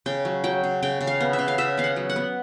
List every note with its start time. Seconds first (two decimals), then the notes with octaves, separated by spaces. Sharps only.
0.06 C#3 G5
0.25 F#3
0.44 F#3 G5
0.64 C#3
0.82 C#3 G5
1.01 C#3
1.07 F5
1.20 B3
1.33 E5
1.39 C#3
1.48 F5
1.58 C#3 E5
1.77 B3 F5
1.84 F#5
1.96 F#3
2.09 F#5
2.16 B3